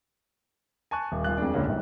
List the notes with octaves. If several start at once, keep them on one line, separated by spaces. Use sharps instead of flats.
G#5 A5 C#6 F#6
D#1
D#1 F4 F#6
F2 G#3 D4
C#2 D3 A#3 C#4
G1 D#2 G#2